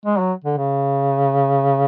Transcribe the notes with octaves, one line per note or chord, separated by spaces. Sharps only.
G#3
F#3
D3
C#3